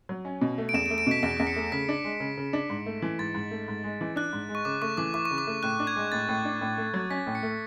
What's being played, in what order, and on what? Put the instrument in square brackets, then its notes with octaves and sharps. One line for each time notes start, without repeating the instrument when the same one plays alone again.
[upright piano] F#3
C#4
B2
A3
[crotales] D7
[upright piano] E2 [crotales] E7
[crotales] D7
[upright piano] A3
[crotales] D7
[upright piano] B2 [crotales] B6
[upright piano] E2 [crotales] D7
[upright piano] E2
[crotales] C#7
[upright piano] A3
[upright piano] C#3 [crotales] B6
[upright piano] D4
G#3
C#3
C#3
D4
G#2
A3
E3
[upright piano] G#2 [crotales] A6
[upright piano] G#2
A3
G#2
G#3
E3
[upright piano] D4 [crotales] F#6
[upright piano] G#2
G#3
[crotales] C#6
[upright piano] C#3 [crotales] D6
[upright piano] A3 [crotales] C#6
[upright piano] E3 [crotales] D6
[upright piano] E4 [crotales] D6
[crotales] C#6
[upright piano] C#3
[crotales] D6
[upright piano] A3
[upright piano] A2 [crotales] F#6
[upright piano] D4
[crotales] G#6
[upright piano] G#3
[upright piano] A2 [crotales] A6
[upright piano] A2
D4
A2
A3
F#3
[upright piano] C#4 [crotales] B6
[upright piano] A2
[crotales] C#7
[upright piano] A3